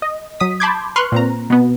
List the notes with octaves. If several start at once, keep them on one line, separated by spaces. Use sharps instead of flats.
D#5
F#3 D#6 B6
A5 B5 C6 D6 G6 G#6
B4 C6 C#6 F6 F#6
A#2 C4 A#5
B2 B3